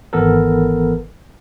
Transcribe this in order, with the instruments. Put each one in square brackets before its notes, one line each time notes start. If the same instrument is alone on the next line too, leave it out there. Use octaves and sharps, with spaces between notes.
[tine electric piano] G#1 E3 B3 A4 A#4